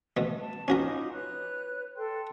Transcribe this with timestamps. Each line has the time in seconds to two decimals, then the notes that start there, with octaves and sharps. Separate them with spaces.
0.17 B2 A3
0.40 A5
0.68 C#4 D#4 F4 F#4 A#4 D6
1.12 B4 C#5 F#6
1.96 A4 G5 C6